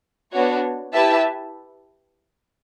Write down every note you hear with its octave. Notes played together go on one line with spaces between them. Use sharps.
B3 D4 F#4 C#5
E4 G4 B4 E5 A5